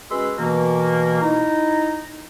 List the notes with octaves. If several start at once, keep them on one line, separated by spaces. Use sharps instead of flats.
G#3 C#4 F#4 B4 C6 E6
B2 E3 A#3
D#4 E4 A#5